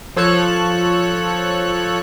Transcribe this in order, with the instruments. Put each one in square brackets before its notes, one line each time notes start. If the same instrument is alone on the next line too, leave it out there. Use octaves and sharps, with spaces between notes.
[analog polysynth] F3 A4 C#5 F#6